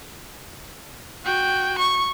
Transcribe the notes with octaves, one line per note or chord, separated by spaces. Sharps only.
F#4 G5
C#6